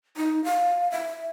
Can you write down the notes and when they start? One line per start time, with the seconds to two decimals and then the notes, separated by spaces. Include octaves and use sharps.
0.17 D#4
0.44 F5
0.92 E5